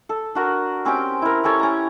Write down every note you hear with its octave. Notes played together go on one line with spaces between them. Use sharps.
A4
D4 F#4 A#4
C4 C#4 G4 G5
E4 A#4
C#4 G4 A4 C#5
C#4 A#5